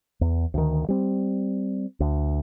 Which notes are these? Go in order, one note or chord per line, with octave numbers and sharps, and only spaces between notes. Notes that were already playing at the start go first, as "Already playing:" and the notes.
E2
D2 D#3
G3 C4
D2